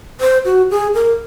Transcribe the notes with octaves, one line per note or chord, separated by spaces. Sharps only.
C5
F#4
G#4
A#4